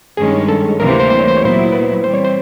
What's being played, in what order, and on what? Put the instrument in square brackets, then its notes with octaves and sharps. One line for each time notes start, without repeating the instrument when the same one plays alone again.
[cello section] G2 D#3 G#3 C#4 [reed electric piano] G#4
[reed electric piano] A4
[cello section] D2 C3 E3 G3 A#3 [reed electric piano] A#4
[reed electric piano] C5
C5
C5
C#5
C5
C#5
[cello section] A#2 F#3 B3 E4 [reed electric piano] C5
[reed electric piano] B4
[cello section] E3 G3 C4 [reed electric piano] C5
[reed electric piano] C#5
C5